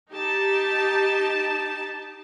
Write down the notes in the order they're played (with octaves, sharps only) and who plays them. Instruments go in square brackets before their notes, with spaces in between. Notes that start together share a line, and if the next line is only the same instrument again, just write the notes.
[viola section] D#4 G4 A5